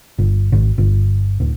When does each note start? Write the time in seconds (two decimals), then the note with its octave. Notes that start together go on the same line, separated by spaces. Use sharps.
0.18 G1
0.52 G#1
0.78 G1
1.40 D1